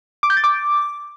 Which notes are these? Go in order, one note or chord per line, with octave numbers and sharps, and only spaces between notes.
D6
G6
A6
D6